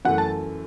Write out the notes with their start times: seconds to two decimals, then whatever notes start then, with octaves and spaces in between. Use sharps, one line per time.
0.05 F#2 E3 A3 F#5
0.18 A5